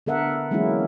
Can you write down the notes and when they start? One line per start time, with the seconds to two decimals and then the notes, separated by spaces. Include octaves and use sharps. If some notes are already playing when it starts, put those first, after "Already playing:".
0.06 D3 B3 A4 A#4 E5 F#5
0.51 E3 F#3 G#3 A#3 C#4 E4